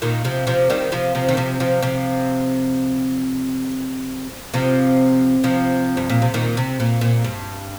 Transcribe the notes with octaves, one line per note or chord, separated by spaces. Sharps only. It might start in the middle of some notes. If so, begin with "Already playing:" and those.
A#2 D#3
C3 F3
C3 F3
D#3 G3
C3 F3
C3 F3
D#3
C3 F3
C3 F3
C3 F3
C3 F3
C3 F3
G2
A#2
C3
A#2 D#3
C3
A#2
A#2
G2